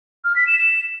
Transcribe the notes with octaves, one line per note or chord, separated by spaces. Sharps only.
F6
B6
E7
E7